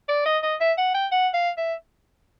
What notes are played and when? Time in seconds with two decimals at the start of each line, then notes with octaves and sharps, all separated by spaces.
0.09 D5
0.26 D#5
0.43 D#5
0.60 E5
0.78 F#5
0.95 G5
1.12 F#5
1.34 F5
1.57 E5